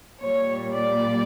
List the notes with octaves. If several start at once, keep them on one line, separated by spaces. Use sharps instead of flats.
A#2 G3 C#5
D5